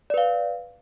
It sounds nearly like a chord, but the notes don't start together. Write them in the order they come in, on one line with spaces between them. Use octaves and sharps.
D5 B4 F5